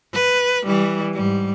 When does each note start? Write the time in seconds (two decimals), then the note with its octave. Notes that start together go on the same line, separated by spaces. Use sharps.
0.14 B4
0.65 E3 G3
1.14 G#2 G3